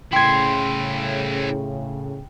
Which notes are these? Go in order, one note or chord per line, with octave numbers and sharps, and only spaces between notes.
A2 C#3 E4 C5 G5 C6 G#6